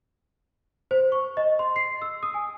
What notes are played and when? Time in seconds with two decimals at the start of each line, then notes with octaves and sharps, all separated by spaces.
0.91 C5
1.12 C#6
1.37 D#5
1.59 C6
1.76 C7
2.02 E6
2.23 D#6
2.34 G#5